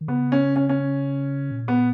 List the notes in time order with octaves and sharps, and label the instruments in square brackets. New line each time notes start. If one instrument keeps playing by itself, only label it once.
[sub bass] D#3
[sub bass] C#3 [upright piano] B3
[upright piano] C#4
C#4
C#4
[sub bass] A#2
[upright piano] B3